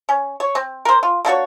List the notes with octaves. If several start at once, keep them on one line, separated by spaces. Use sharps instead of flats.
C#4
C#5
C4
A#4 C5
F4
A#3 D4 F#4 C#5